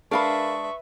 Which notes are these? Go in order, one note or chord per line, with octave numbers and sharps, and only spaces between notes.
G#3 D4 A#4 B4 E5 F5 B5 C#6